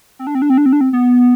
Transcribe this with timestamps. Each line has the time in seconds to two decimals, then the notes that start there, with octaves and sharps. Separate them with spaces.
0.19 C4
0.27 D4
0.35 C4
0.42 D4
0.50 C4
0.58 D4
0.66 C4
0.73 D4
0.81 C4
0.93 B3